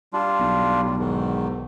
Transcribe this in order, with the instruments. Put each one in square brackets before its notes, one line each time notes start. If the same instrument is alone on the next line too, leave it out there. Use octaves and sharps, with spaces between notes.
[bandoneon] G3 D4 F4
[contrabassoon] B1
[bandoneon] A2 G3
E2 G#2 D#3